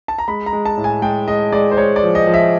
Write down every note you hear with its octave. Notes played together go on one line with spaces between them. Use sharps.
A5
A#5
G#3 B5
A#5
G#3
A5
A2
G#5
G#3 G5
G#3 D#5
G#3 D5
C5
G#3 C#5
D5
F3
D#5
F3
E5